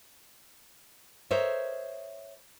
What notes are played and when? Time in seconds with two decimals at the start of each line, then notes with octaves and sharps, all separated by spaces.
1.31 A#4 C5 C#5 D#5 E5